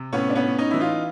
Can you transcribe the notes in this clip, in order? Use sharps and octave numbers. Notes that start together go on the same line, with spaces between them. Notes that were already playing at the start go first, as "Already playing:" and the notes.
Already playing: C3
A2 B3 C#4
D4
B3 C#4
A2
C#4 D#4
E3 E4
D#4 F4